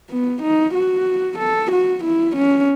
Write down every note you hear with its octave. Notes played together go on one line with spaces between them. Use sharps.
B3
D#4
F#4
A4
F#4
E4
C#4